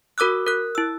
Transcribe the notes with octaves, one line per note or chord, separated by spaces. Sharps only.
F#4 A#4 D6 E6 F#6
A#4 F#6
E4 E6